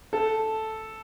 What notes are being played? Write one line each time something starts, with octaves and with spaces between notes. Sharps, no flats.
A4